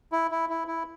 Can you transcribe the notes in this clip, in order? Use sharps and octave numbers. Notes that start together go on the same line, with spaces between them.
E4
E4
E4
E4